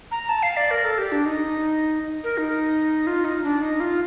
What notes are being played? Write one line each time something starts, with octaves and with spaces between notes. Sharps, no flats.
A#5
A5
F5
D5
A#4
A4
G4
D4
D#4
A#4
D#4
F4
D#4
D4
D#4
F4